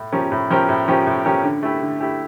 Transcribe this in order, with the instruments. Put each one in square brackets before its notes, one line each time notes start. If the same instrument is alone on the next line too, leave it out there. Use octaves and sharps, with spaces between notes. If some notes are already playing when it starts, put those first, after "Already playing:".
Already playing: [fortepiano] A2
F3 C#4 G4 A#4
A2
F3 C#4 G4 A#4
A2
F3 C#4 G4 A#4
A2
F3 C#4 G4 A#4
D3
A3 E4 G4
D3
A3 E4 G4